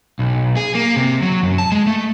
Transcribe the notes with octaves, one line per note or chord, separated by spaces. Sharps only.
B1
G#4
A#3
C3
F#3
F#2
A5
G#3
A3